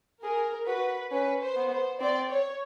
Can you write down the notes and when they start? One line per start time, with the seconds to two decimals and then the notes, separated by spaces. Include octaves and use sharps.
0.23 G#4 A#4
0.67 F#4 B4
1.11 C#4 B4
1.42 C5
1.56 B3
1.72 C5
2.00 C4 D5
2.31 C#5